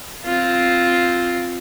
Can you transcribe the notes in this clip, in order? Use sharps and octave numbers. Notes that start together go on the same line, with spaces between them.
C4 F4